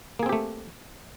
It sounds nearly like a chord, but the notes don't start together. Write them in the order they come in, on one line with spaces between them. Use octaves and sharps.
A#3 G#4 C4 G4 A3